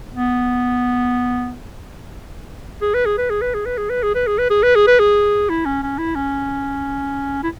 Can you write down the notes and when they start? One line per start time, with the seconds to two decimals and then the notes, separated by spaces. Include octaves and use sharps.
0.14 B3
2.82 G#4
2.94 B4
3.06 G#4
3.18 B4
3.30 G#4
3.41 B4
3.54 G#4
3.65 B4
3.78 G#4
3.90 B4
4.03 G#4
4.15 B4
4.27 G#4
4.38 B4
4.50 G#4
4.63 B4
4.75 G#4
4.87 B4
4.99 G#4
5.49 E4
5.66 C#4
5.82 C#4
5.98 E4
6.15 C#4
7.43 E4